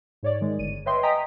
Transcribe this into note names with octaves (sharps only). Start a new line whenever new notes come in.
G#2 C#5 D5
D#3 G#3
G1 D#7
B4 C#5 D#5 E5 G5 C6
D#5 G5 G#5 A#5 D#6 B6